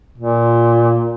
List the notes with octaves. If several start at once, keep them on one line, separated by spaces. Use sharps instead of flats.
A#2